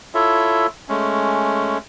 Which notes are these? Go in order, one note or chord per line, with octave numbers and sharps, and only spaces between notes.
E4 F4 A4 C#5 E5
G#3 A3 C#4